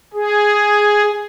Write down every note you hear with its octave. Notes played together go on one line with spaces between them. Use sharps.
G#4